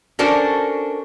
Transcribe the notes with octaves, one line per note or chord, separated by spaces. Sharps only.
C#4 D4 F#4 A4 A#4 C5